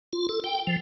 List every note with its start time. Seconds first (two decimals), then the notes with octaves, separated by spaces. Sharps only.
0.13 F4
0.29 A4
0.44 G5
0.67 F3